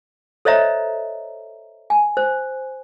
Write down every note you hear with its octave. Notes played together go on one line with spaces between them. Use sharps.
A4 C5 C#5 D#5 E5 A#5
G#5
C5